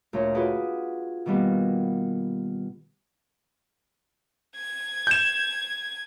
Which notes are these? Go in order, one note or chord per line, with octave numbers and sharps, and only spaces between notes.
D2 A#2 C#5 A#5
F4 F#4 G#4 B4 D5 D#6
B2 D#3 G3 A#3 B3
G#6
G6 E7